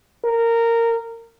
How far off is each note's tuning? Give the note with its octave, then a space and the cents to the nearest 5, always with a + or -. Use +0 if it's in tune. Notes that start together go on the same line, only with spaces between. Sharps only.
A#4 -15